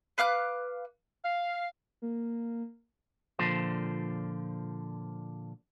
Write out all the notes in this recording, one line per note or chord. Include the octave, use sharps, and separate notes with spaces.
B4 F5 D6 F#6
F5
A#3
A#2 D3 F3 C5